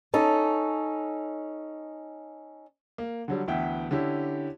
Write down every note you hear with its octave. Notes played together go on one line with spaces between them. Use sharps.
C#4 D#4 A4
A#3
D3 F#3 G3
D2 E3 B3 E5 G5
D3 C#4 E4 G4